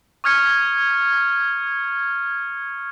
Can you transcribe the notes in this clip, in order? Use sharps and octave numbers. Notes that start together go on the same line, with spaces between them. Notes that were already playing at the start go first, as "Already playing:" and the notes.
C#6 D#6 F6 G#6 C#7